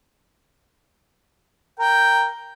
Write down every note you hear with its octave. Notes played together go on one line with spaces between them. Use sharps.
A#4 G5